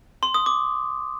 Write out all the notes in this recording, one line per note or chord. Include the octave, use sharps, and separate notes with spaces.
C6
D#6
D6